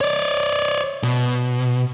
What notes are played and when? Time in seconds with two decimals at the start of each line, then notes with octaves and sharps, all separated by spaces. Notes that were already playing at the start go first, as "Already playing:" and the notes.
0.01 C#5 D5
1.03 B2